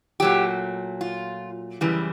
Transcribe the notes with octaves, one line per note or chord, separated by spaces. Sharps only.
A#2 F#3 A3 G4
F4
F#2 C#3 E3 G3